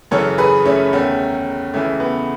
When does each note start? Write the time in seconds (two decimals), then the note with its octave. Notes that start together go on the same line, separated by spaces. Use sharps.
0.11 F#2 C#3 E3 A4 C#5
0.38 G#4 B4
0.65 A3 C#4
0.93 E2 D#3 A3 C#4
1.74 C#2 C#3 E3 A3
2.00 B3